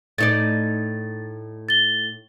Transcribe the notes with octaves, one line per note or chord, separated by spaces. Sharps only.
A2 D#4 D5 A6
A6 G7